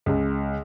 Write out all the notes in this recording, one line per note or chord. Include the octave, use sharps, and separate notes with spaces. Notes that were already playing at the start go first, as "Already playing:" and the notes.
C#2